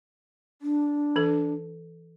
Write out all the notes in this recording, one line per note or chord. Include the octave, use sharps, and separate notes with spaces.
D4
E3 A4